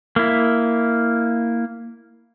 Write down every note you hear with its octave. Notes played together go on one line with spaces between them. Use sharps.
A#3 E4